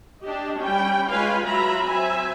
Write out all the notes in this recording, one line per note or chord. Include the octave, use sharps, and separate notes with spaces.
D4 G4 D#5
G3 C#4 G5 B5
G#3 F4 B4 C#5 F5 G#5
F#3 F4 E5 A#5 B5
C4 C5 E5 G#5